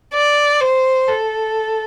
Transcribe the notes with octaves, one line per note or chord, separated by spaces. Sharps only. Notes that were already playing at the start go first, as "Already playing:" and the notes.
D5
C5
A4